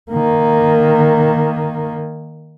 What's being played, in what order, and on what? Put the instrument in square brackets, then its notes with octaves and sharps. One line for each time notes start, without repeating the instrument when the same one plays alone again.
[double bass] D#3 A#3